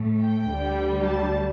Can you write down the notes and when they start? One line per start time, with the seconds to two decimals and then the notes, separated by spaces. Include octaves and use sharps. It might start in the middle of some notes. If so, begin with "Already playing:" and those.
Already playing: A2 A3
0.22 G5
0.50 D2 D3 G3
1.07 A5